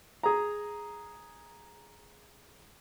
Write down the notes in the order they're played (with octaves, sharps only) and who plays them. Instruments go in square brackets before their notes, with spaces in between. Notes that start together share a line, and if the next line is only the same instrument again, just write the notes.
[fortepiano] G#4 A#5